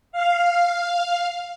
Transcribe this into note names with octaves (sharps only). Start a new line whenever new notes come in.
F5